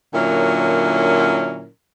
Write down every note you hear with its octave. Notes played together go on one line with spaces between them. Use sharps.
A#2 D3 F#3 C#4 E4 A#4